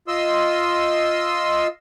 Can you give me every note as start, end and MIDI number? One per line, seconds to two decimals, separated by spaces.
0.08 1.67 65
0.08 1.67 75
0.08 1.67 84
0.08 1.67 88